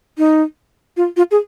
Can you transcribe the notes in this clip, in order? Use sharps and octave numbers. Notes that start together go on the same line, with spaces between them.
D#4
F4
F4
G#4